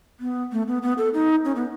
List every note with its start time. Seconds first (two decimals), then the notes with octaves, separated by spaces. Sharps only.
0.20 B3
0.52 A3
0.68 B3
0.82 B3
0.98 A4
1.14 D#4
1.45 C#4
1.56 B3